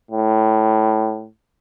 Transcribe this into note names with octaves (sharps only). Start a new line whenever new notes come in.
A2